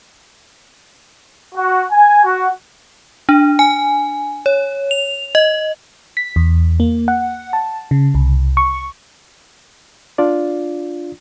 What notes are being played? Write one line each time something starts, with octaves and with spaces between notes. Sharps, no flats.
F#4
G#5
F#4
D4
G#5
C#5
F7
D#5
B6
E2
A#3
F#5
A5
C#3
C2
C#6
D4 F4 D5